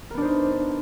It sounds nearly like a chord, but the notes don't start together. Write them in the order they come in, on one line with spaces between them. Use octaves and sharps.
A#4 B3 D4 C5 D#4